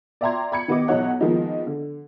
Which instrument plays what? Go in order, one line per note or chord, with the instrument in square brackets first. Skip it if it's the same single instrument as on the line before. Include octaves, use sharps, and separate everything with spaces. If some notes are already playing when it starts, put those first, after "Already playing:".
[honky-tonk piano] D5 E5 G5 A#5 C6 G#6
B5 G#6 C#7
D#3 B3 G4 D#5 D6
B1 E2 D#4 C#5 F#5
D#3 F3 G#3 A#3 B3 D#4
D3